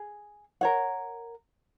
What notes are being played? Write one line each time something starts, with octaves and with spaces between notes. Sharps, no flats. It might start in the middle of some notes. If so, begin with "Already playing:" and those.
Already playing: G#4
A#4 C#5 F#5